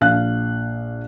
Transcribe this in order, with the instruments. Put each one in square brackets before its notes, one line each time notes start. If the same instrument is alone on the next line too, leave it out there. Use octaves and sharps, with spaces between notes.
[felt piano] A#1 F5 F#6